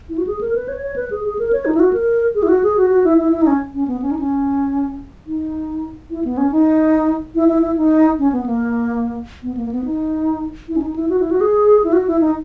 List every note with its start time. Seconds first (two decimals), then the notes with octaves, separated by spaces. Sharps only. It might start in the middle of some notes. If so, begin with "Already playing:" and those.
0.09 E4
0.18 F#4
0.27 G#4
0.41 A#4
0.55 B4
0.68 C#5
0.82 C#5
0.96 B4
1.11 G#4
1.24 G#4
1.39 A#4
1.53 C#5
1.65 D#4
1.75 E4
1.80 F#4
1.93 A#4
2.35 G#4
2.43 E4
2.49 F#4
2.63 G#4
2.77 F#4
2.90 F#4
3.04 E4
3.19 E4
3.32 E4
3.42 D#4
3.47 C#4
3.74 C#4
3.88 B3
4.02 C#4
4.11 D#4
4.19 C#4
5.27 D#4
6.10 E4
6.25 B3
6.38 C#4
6.52 D#4
7.35 E4
7.49 E4
7.62 E4
7.77 D#4
8.19 C#4
8.32 B3
8.46 A#3
9.43 B3
9.57 A#3
9.71 B3
9.85 D#4
10.68 E4
10.76 C#4
10.82 D#4
10.96 E4
11.09 F#4
11.20 E4
11.31 F#4
11.41 G#4
11.84 E4
11.93 F#4
12.07 E4
12.21 D#4